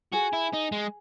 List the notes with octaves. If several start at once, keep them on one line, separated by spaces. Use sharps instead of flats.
F#4 G#4
E4
D#4
G#3